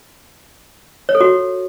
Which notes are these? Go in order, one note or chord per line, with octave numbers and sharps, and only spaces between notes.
C#5
A4
F#4